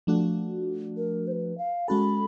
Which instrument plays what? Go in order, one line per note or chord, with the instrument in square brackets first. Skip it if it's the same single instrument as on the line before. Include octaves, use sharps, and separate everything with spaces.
[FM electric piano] F3 A3 D4 F#4
[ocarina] A#4
C5
B4
F5
[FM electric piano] G#3 C#4 F#4 A4 [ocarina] B5